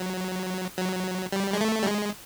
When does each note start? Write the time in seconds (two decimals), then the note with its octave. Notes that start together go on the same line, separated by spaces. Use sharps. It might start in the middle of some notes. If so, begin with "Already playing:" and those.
Already playing: F#3
0.78 F#3
1.32 G3
1.53 G#3
1.61 A3
1.83 G3
1.87 G#3